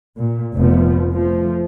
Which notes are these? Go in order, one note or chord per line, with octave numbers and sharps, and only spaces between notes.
A#2
F1 A#2 F3 B3
F3 A3